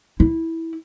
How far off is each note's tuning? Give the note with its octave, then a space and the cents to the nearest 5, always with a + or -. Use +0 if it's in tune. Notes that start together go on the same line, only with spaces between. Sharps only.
E4 -15